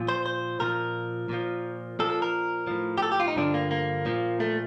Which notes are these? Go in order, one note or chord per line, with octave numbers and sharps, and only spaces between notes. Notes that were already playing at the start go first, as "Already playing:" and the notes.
Already playing: A#2 F3
C5
C5
A#2 F3 A#4
A#2 F3
A#2 F3 A4
A4
A#4
A2 F3
G4
A4
G4
F4
D#4
G2 D3 F3 D4
A#3
A#3
A#2 F3
A3